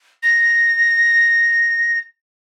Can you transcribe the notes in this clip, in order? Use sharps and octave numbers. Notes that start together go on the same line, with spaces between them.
A#6